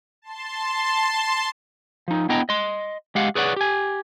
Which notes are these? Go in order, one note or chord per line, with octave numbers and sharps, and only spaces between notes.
A5 C6
F3 D#4
B3 D4 E4 D#5 G5 A#5
D#5 C6
G#3 G4 F5 F#5
G#4 B4 C#5 D5 F5 F#5
G4 G#5